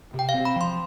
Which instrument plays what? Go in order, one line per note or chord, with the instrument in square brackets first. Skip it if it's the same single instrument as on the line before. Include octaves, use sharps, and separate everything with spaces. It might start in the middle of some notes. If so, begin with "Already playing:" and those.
[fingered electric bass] C3
[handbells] G5
F5
[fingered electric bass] C4
[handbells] B5
[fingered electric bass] F3 [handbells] C6